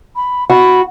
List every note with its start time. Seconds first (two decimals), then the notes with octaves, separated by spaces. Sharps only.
0.16 B5
0.50 F#4 B5